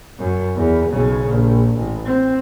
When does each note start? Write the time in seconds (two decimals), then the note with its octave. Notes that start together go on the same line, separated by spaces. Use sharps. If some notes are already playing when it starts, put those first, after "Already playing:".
0.19 F#2
0.55 E2
0.90 B1 C#3
1.27 A#1
1.77 A1
2.05 C4